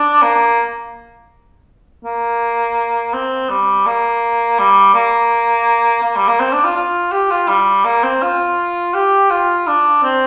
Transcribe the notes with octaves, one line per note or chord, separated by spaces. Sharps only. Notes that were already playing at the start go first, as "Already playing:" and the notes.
Already playing: D4
A#3
A#3
C4
G3
A#3
G3
A#3
A#3
G3
A#3
C4
D4
F4
F4
G4
F4
G3
A#3
C4
F4
G4
F4
D4
C4